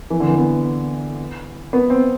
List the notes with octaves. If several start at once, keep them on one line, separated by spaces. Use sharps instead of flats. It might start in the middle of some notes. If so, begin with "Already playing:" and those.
E3
D3
E3
B3
B3
C4